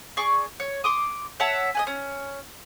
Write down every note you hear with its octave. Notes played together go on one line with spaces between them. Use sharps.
G#4 D5 C#6
C#5
C6 D6 D#6
C#5 E5 F#5 A5
D#5 F#5 G#5
C#4